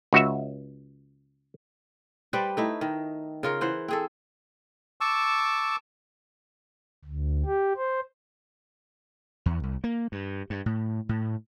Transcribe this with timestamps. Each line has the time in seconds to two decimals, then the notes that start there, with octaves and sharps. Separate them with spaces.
0.13 C#2 F#4 E5
2.33 G3 B4 C5 D5
2.57 A3 D#4 E4
2.81 D#3
3.43 C#3 F4 A#4
3.61 E3 C5 F#5
3.88 C4 G#4 A4
5.01 A5 C#6 D6 E6
7.05 D2
7.46 G4
7.77 C5
9.46 E2
9.63 C2
9.84 A#3
10.12 G2
10.50 G2
10.66 A2
11.09 A2